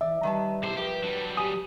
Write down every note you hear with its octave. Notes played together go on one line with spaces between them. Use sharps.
E3 D5 E5
D#3 G3 B4 A5
B1 E4 G4 C5
F3 G3 G4 A#4 B4
F#3 G3 D4
G4 G#5 D#6